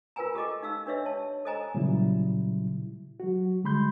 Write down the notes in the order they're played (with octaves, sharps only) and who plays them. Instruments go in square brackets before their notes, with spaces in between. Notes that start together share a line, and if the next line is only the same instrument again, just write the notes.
[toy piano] F4 A#4 B4 G5 G#5 A#5
G4 A4 D#5 D6
D#4 F5 E6
D4 G4 B4 C#5 D#5 E5
C#5 A5
A4 C5 D#5 G#5 A#5
[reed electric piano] A#2 C#3 F#3 G3 E4
F#3 F#4
D3 G3 G#3 B5 C6 G6